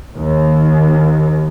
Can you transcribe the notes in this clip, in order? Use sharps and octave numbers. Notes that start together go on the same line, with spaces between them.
D#2